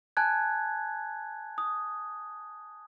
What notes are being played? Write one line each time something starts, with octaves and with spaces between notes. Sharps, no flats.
G#5 A5 F#6 G#6
D#6